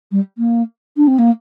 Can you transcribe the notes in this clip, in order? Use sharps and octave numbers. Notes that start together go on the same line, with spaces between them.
G3
A#3
D4
C4
A#3